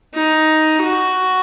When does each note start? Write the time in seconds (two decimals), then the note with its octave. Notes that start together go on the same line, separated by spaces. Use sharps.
0.15 D#4
0.83 F#4